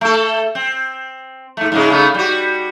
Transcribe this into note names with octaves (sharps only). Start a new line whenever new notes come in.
A3 A4
C4
G#2 A3
G#2 C#3 G#3
C#3 A3 D#4
G3 F#4